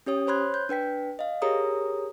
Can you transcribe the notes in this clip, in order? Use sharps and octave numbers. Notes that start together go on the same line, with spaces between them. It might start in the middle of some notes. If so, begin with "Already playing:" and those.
C#4 G4 C#5 D#6
C5 C#5 B5 C6 F#6 G#6
G6
D4 B4 G5 B6
D#5 F5
G4 G#4 A#4 C#5 A#5 D#6